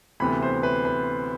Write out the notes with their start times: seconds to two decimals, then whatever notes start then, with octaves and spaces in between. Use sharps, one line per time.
0.20 D2 C3 E3 B3 B5
0.42 C5
0.63 B4
0.85 B4